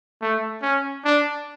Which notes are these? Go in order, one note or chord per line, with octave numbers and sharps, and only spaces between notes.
A3
C#4
D4